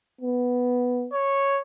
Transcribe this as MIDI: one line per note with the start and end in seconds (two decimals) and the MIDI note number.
0.21 1.07 59
1.13 1.61 73